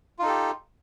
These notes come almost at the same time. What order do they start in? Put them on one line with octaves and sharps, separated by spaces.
F4 D#4 A4 G4